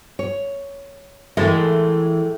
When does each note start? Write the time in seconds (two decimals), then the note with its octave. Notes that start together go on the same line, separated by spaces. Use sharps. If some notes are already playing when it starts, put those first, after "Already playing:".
0.19 C#5
1.37 A2 E3 G#3 A3 A4 A#4